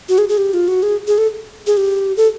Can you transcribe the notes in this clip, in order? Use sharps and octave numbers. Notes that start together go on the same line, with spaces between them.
F#4
G#4
G#4
G4
F4
F#4
G#4
G#4
A4
G#4
G4
A4